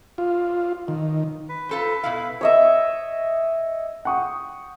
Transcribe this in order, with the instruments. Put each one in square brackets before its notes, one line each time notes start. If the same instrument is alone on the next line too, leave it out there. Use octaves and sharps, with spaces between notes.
[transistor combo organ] F4
D#3
[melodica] B4
[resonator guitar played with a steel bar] F4 A4 C5
B2 E4 F5
[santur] C#5 D#5 E5
[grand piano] F#5 G5 C#6 D#6